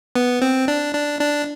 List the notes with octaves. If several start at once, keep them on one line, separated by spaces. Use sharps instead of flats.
B3
C4
D4
D4
D4